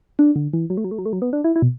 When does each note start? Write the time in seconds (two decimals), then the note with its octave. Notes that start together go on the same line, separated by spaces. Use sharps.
0.19 D4
0.36 D3
0.53 E3
0.70 F#3
0.77 A3
0.84 F#3
0.91 A3
0.98 F#3
1.06 A3
1.13 F#3
1.22 B3
1.33 D4
1.44 E4
1.56 E4
1.62 B2